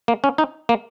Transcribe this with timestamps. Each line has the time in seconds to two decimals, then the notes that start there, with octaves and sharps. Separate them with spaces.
0.08 A#3
0.24 C#4
0.38 D#4
0.69 A#3